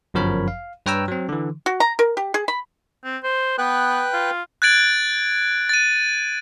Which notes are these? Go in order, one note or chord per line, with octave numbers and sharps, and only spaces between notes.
G1 F#2 F3 A#4 C#5 B5
F5
G2 B4 C#5 G5 A#5 E6
F#3 C4
D3 E3
F#4
A#5
A#4
G4
G#4
B5
C4
C5
B3 B4 G5 F#6
F4
F#6 G#6 A6 D7 F#7
A6 D#7